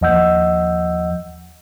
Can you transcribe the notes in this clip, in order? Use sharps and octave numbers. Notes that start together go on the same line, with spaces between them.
D#2 F3 D#5 F#5 E6 G6